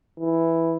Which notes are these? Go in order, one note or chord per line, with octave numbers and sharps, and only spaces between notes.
E3